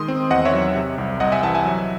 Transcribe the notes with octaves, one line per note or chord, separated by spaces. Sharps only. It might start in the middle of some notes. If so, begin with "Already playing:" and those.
Already playing: D#3 G#3 C6 D#6
C4
E2 D#5 F#5
C#5 E5
F#3
C3
C2
C2 D#5 F#5
E5 G#5
E3 F#5 A5
E5 G#5
F#3